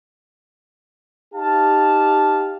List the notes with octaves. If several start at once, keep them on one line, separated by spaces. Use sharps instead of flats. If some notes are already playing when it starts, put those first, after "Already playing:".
D#4 G4 F5 A5